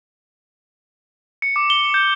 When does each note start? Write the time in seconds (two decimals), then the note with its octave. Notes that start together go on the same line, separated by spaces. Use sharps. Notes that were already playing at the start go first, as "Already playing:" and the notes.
1.42 C#7
1.56 D6
1.70 G7
1.94 G6